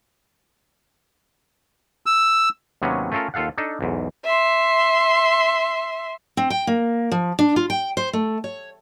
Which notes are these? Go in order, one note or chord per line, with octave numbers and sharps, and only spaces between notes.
E6
D#2 C3 F#3 B3 C#4
A3 C#4 F4 A4 A#4
D#2 F4 A4 F5 F#5
D4 D#4 A4
B1 E2 G#2
E5 C6
C4
G5
A#3
F3
D4
F4
G5
C5
A3
C#5